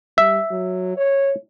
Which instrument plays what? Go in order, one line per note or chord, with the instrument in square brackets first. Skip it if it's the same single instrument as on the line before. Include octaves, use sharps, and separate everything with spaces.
[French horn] G3 [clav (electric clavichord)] E5
[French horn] F#3
C#5